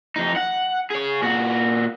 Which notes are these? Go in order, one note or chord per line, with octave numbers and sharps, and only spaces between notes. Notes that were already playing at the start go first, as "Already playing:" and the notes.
F2 D#4
F#5
G#4 C#5
A#2 F#4